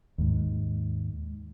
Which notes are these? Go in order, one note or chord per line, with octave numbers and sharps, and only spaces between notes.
D#2 G#2